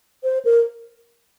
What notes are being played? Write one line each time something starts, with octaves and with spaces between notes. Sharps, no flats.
C5
A#4